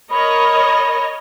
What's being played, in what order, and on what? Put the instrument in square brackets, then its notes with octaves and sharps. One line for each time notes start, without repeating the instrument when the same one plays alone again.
[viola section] A#4 C#5 D#5 [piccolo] B5